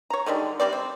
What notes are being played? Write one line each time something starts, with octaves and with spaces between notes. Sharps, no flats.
C#5 A#5
D3 D#3 G3 G#3
C3 G3 C4 D5
C4